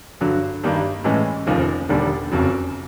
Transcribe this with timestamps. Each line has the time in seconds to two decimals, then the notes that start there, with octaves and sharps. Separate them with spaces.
0.21 G2 D3 F#3
0.63 G2 D#3 G3 A#3 D4
1.04 A2 E3 G#3 C#4
1.46 F1 D#2 C#3 F3
1.89 E1 D#2 D3 G3
2.32 F#1 F2 C#3 F#3